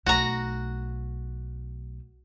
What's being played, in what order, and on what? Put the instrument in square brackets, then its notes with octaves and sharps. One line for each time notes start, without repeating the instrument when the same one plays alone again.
[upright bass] B1 A3 [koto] F#4 A#5